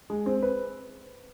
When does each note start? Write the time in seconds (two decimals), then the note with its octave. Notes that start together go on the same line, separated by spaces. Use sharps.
0.10 G#3
0.26 C4
0.43 B4